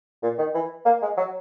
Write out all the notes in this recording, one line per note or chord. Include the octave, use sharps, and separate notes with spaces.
A#2
D#3
E3
A#3
G#3
F#3